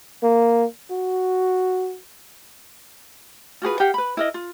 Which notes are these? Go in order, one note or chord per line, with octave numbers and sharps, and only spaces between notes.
A#3
F#4
F4 F#4 G#4 B4
G4 A#4 F5 F#5
B4 B5
E4 A#4 D#5
F4